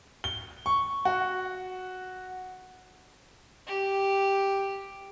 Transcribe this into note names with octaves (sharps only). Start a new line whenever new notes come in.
G7
C#6
F#4
G4